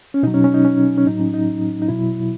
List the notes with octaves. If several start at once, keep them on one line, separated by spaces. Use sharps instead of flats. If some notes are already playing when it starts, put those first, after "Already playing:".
C#4
B2 F#3 D#4
C#4
C#4
D#4
C#4
C#4
A2 F#3 D#4
C#4
D#4
D#4
B2 F#3 E4